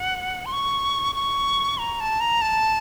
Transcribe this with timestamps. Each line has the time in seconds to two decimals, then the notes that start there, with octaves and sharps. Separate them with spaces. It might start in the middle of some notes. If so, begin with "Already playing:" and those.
Already playing: F#5
0.46 C6
0.53 C#6
1.15 C#6
1.78 A#5
2.00 A5
2.20 A#5
2.42 A5